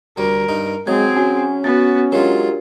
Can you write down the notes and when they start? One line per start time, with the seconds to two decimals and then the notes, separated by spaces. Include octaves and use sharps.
0.18 D2 G3 A#4
0.49 G2 D#4
0.87 F#3 G#3 C4 G#4 G#6
1.17 C#4 F#4 G#5
1.64 B3 F#4 A6
2.12 F#3 G#3 D4 F4 G4 A#4